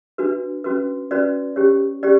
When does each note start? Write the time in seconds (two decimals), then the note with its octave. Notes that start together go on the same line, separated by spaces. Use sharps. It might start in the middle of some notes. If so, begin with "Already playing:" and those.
0.18 D4 F#4 B4
0.64 C#4 F#4 B4
1.11 C#4 F#4 B4 D5
1.56 C#4 G4 C#5
2.03 C#4 G4 D5